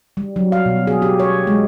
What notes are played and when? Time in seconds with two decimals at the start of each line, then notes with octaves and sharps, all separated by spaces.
0.17 G3
0.36 F#3
0.52 F5
0.66 B2
0.87 G#4
1.02 G4
1.19 C#5
1.47 G#3